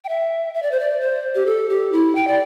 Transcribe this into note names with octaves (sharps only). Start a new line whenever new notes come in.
G5
E5
E5
D5
C5
D5
C5
G4
A4
G4
E4
G5
D5